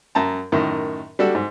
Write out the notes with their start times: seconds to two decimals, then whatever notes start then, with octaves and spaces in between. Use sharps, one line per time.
0.15 F#2 A5 A#5
0.52 F#2 A2 D#3
1.19 G3 D4 F#4 A4
1.35 G#2